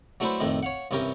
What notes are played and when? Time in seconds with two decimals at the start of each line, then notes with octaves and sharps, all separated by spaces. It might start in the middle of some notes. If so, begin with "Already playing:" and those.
0.20 F#3 A3 D4 E4 B4 C5
0.40 F2 A2 D#3 D4
0.63 C#5 F5 F#5
0.91 C2 G2 E3 C#4 G4 A#4